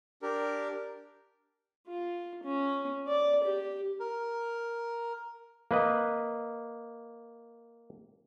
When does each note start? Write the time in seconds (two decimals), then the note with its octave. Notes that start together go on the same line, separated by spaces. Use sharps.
0.22 D4 G4 A#4
1.88 F4
2.43 C#4
3.08 D5
3.44 G4
4.00 A#4
5.71 A#3 B4 D#5